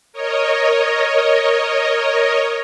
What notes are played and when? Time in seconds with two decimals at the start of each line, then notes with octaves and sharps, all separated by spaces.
0.13 A#4 C#5 D#5